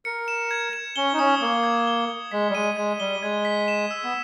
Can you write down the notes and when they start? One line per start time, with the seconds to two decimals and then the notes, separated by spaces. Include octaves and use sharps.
0.05 A#4 C#7
0.28 E7
0.51 G#6
0.73 E7
0.96 C#4 G7
1.13 D#4
1.19 C#4 D#6
1.41 A#3 D#6
1.64 G#6
1.87 G7
2.10 G7
2.31 G#3 B6
2.50 G3
2.55 G#3 D#7
2.77 G#3 G#6
3.00 G3 G7
3.22 G#3 G#6
3.45 B6
3.68 E7
3.91 E6
4.04 B3